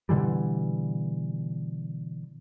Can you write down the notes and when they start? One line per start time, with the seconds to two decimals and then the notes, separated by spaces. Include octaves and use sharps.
0.09 B2 D3 E3 G3